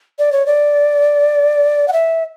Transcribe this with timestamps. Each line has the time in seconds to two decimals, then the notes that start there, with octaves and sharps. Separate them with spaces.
0.19 D5
0.32 C#5
0.47 D5
1.88 F#5
1.93 E5